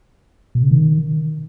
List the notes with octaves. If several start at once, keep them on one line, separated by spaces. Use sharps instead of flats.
B2
C#3
D#3